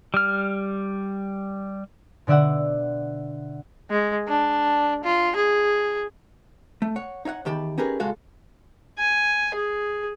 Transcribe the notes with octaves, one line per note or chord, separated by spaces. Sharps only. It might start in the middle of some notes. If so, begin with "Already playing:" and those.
G3 F6
B2 D3 D5 E5 F#5
G#3
D4
F4
G#4
A3
C#5 F#5
D#4 C#5 F5 F#5
E2 D#3 G4 A5 B5
C#4 D#4 G4 G#4 A#4 B4
C#2 A#2 G#3 F#4 A4 F5
G#5
G#4